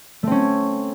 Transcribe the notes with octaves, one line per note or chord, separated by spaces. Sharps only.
A3 C4 C#4